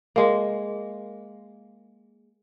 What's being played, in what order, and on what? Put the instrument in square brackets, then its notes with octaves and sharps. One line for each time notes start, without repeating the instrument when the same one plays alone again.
[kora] G#3 A#3